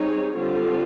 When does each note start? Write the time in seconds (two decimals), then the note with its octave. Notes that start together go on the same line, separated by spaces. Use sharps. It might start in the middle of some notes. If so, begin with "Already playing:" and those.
Already playing: G3 C4 D#4 G#4 C#5
0.37 D3 G3 C4 F4